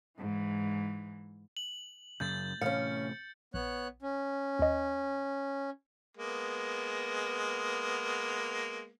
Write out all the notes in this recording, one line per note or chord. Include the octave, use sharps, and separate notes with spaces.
G#2 E3
F#7
F#2 C#3 G6 A6
A2 C3 E3 C#4 F5 C#7
A#1 B3 C#5 F#6
C#4
D#2 D#5
G#3 A#3 B3